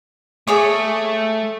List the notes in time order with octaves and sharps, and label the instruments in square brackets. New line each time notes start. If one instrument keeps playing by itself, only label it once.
[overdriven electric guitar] A3 [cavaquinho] G#4 C#5 D6